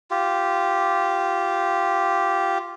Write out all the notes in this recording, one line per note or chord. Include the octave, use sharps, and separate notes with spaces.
F4 G4